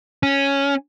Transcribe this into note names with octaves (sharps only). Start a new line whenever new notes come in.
C#4